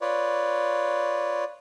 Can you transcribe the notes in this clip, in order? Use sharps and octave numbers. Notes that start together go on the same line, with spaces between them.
F4 B4 C#5 D5